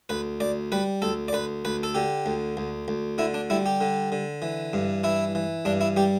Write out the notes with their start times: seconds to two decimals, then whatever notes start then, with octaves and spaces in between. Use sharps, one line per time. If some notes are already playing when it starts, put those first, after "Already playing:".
0.09 D2 B4
0.40 D2 D5
0.72 G3 B4
1.02 D2 A4
1.28 D5
1.33 D2 B4
1.65 D2 B4
1.83 A4
1.95 D3 G4
2.26 D2
2.57 D2
2.88 D2
3.18 D3 E4
3.34 D4
3.50 G3 E4
3.66 G4
3.81 D3
4.12 D3
4.42 E3
4.73 G2
5.04 E3 E4
5.35 E3
5.65 G2 D4
5.81 E4
5.97 G3 G4